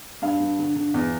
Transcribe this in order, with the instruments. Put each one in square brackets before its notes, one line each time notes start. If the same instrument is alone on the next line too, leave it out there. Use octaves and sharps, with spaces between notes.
[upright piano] G2 F5
G2
D3
D3
E2